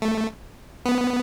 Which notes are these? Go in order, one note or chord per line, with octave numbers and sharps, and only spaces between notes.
A3
B3